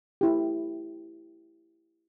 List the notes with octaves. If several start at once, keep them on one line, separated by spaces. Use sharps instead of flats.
E4 G4